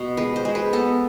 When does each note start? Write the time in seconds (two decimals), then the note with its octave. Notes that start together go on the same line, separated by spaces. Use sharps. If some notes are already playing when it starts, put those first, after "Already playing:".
Already playing: B2
0.17 G#3 B4
0.36 C5
0.45 G#3
0.55 B4
0.73 B3 A4